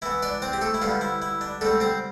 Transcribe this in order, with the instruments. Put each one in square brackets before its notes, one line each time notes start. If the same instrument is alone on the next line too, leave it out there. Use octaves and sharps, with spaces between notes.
[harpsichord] E3 B3 E4
D4 D5
C4 C5
G4
A3 A4
E4
D3 F3 G3 B3 F4
E4
E4
D4
D3 G3 A3 C4 A4
C4 C5